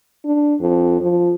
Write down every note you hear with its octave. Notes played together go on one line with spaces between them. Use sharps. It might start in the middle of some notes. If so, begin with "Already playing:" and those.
D4
F2
F3